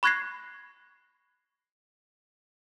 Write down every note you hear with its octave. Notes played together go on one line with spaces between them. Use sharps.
B5 C#6 F#6 G#6 A#6 C7